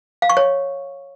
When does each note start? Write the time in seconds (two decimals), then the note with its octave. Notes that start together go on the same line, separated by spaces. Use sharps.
0.22 F5
0.29 C#6
0.37 C#5